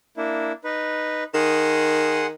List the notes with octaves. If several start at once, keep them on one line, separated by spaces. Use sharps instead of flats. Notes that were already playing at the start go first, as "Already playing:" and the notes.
A#3 D4 E4
D#4 B4
D#3 G#4 F#5 C6